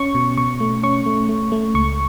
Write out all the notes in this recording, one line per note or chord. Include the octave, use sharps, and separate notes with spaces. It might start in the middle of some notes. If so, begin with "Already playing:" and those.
Already playing: C#4 C#6
B2
B2 C#6
A3
C#4 C#6
A3
A3
A3
C#2 C#6